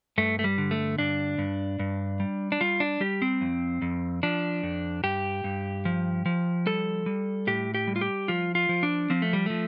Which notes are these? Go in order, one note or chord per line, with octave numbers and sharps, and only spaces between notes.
G2 A3
A3
G3
D3
A3
G2 D4
G2
G2
G3
D4
G3 F4
D4
G3 G4
C4
F2
F2
F3 D4
F2
G2 G4
G2
F3
F3
G3 A4
G3
A2 G4
G4
G3
F4
G4
F3 F4
F4
F3
D4
F3 C4
A3
G3
F3 A3